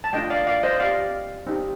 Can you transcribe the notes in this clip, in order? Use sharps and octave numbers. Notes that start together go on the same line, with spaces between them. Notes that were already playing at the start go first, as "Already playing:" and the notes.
A5
A3 D4 F4 D#5 G5
D5 F5
D5 F5
C5 D#5
C4 G4 D5 F5
C4 D#4 G4